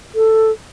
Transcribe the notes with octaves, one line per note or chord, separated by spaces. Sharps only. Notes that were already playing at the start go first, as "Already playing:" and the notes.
A4